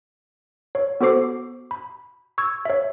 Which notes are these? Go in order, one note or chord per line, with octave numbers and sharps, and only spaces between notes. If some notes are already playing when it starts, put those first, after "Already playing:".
C#5
B3 F#4 A4 C5 D6 C7
B5
C#6 E6 G#6
C#5 E5